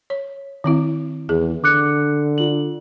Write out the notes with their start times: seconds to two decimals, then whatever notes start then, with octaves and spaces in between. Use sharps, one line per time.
0.10 C#5
0.64 D#3 C4 E4
1.29 E2 G#4
1.64 D3 D6 F#6 C#7
2.38 F4 F#7